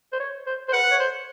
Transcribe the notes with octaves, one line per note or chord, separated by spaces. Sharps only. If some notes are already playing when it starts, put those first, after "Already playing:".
C5
C#5
C5
C5
B4 F#5
C#5
C5